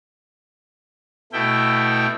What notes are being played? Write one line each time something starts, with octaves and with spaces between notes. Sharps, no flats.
B2 A3 E4 G5